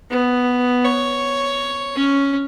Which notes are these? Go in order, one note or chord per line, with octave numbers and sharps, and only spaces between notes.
B3
C#5
C#4